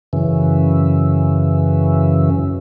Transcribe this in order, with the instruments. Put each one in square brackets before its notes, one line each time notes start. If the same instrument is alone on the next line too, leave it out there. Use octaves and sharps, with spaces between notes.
[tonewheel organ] F#2 C#3 E3